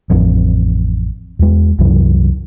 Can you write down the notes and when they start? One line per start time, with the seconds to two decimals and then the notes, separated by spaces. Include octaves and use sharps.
0.10 A1 F2
1.39 E2 G#3
1.79 C2 F#2 E3